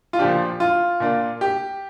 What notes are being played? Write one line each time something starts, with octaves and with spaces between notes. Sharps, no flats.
F4
A#2 F3 D4 G4
F4
A#2 A#3 D4
G4